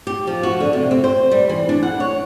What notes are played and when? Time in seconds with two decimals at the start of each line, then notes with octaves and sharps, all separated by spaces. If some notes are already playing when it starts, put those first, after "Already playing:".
0.07 G4
0.27 F3
0.43 F#4
0.60 D3
0.73 C3
0.91 C4
1.04 C5
1.31 G3
1.49 E3
1.69 D4
1.83 F#5
2.00 C#5